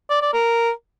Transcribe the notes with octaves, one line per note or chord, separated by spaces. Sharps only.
D5
D5
A#4